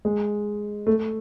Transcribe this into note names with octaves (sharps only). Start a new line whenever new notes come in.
G#3
A3